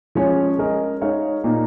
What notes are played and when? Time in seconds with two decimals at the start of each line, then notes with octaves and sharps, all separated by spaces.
0.15 F3 G#3 C#4 G#4 C#5
0.59 G#3 C#4 A#4 D#5
1.01 G#3 D#4 C#5 F5
1.44 A#2 A#3 D#4